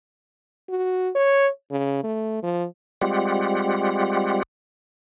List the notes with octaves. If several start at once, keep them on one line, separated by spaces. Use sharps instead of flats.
F#4
C#5
C#3
A3
F3
G3 G#3 C4 F4 G4 F#5